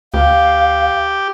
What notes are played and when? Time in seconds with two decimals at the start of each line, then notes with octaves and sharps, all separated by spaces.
0.14 D2 G4 F5